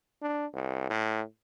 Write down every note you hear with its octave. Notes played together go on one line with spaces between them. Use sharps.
D4
C2
A2